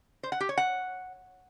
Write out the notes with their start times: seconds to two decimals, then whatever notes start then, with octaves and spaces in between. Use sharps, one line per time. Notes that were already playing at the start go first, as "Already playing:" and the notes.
0.23 C5
0.32 F#5
0.40 G4
0.49 C#5
0.57 F#5